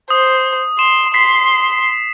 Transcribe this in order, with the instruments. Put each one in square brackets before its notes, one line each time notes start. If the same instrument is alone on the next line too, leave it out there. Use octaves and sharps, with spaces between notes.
[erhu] C5 [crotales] D#6
[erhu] C6 [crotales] E7
[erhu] C6 [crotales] B6 C7